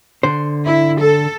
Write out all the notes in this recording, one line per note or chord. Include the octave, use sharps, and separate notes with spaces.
D3 C5
E4
A4